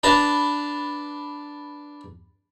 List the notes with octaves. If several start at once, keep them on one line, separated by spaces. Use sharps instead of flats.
D4 B4 A5 A#5